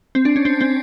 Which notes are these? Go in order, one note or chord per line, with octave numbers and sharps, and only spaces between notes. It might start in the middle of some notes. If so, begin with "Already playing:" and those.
C4
D4
C#4
C4
C4